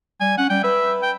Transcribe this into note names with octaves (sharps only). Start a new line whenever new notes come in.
G3 G#5
C#4 F#5
G3 G5
B4 E5
G5